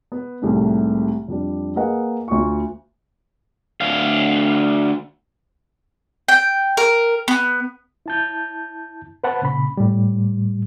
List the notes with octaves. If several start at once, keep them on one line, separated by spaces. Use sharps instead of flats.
B3
C2 A2 C3 D#3 G#3 A3
F2 G3 D4
A#3 G#4 B4 D#5 F5 F#5
D2 F4 C#6
D2 F5
G5
A#4
B3
E4 A5 G6
B4 C5 F#5 A5 B5
A#2 C#3 B5
A2 G3